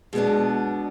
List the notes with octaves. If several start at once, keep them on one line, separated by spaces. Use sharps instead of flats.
B2 F#3 G#3 B3 D4